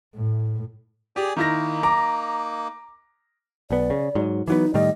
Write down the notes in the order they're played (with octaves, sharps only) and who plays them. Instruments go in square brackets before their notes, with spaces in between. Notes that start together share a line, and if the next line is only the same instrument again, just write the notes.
[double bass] A2
[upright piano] G4 [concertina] G#4 D5 G#5
[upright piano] D#3 E4 A#6 [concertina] A#3 D#4
[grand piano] A#5 [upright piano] D6
[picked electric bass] B1 B3 [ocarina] D5
[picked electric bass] C#3
G#2 F#3
[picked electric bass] E3 F#3 B3 [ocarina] D#4
[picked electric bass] A2 D#3 G3 [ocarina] D#5